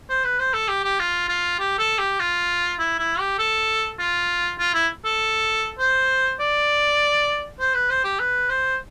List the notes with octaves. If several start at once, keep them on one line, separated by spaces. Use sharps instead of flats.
C5
B4
C5
A4
G4
G4
F4
F4
G4
A4
G4
F4
E4
E4
G4
A4
F4
F4
E4
A4
C5
D5
C5
B4
C5
G4
B4
C5